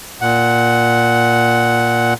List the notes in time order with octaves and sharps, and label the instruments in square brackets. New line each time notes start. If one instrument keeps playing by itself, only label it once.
[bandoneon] A#2 F#5